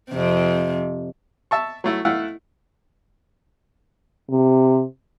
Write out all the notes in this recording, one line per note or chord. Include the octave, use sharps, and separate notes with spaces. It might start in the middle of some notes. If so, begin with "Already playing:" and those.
F2 C3
E5 A5 C#6
F#3 A3 E4
A3 E4 F5 F#5
C3